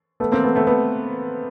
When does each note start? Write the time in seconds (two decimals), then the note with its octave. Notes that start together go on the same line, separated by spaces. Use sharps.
0.20 A3 B3
0.32 A#3 C4
0.43 A3 B3
0.55 A3 B3
0.67 A3 B3